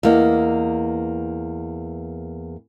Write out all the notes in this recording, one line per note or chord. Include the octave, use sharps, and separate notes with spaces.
E2 A#3 D#5